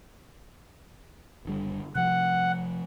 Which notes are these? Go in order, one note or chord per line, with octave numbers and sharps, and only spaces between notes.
F#1 D3 G3
C3 F3 G3 F#5